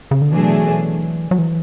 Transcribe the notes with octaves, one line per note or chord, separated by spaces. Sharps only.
C#3
D3
B2 E3 F#3 A3 D4 G#4
F#3
E3